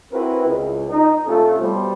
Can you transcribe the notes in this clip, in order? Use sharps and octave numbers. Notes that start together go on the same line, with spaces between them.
C4 E4 F#4 G#4 A#4 B4
C#2
D#4
C3 A3 C#4 F4 A4
B2 G3 C5